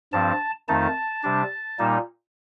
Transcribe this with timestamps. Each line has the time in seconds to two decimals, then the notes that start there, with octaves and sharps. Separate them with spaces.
0.13 G2 F3 C4 A5
0.68 F2 D#3 A3 D#4 A5
1.23 C3 G3 D4
1.79 A#2 G3 A#3 D#4